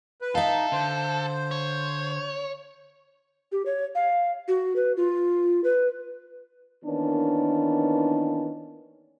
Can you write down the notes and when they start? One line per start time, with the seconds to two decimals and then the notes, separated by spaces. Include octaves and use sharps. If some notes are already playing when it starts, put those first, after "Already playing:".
0.21 B4
0.35 D#4 A4 E5 F5
0.72 D3 C5
1.51 C#5
3.52 G4
3.66 C#5
3.95 F5
4.48 F#4
4.76 B4
4.97 F4
5.64 B4
6.85 D#3 E3 A#3 B3 C#4 D4